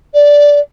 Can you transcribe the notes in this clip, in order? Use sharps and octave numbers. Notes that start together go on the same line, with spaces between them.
D5